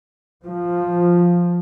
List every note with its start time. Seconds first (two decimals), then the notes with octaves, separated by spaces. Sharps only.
0.47 F3